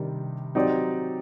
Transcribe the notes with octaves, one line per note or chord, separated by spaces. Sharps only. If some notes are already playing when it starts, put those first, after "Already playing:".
Already playing: C3 D#3 G3 D4
F#3 C4 D#4 G4 D5